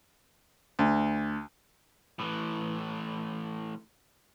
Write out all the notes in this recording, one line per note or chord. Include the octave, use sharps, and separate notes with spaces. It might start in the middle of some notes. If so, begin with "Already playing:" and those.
D2
A2 E3